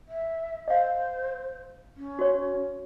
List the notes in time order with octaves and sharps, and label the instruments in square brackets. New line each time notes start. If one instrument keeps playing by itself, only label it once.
[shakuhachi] E5
[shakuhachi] C5 [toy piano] D#5 F5
[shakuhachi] C#4
[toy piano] F#4 C#5